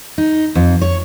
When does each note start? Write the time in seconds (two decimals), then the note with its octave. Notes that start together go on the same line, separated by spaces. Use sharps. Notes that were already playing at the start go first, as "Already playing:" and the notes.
0.18 D#4
0.55 F2
0.82 C#5